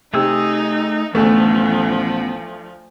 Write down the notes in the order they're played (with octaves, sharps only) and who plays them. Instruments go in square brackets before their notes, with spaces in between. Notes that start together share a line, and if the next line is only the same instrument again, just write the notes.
[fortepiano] C3 [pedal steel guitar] A3 G#4 E6 [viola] D#4
[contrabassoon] A1 [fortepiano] D2 A3 [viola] F3 [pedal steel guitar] B3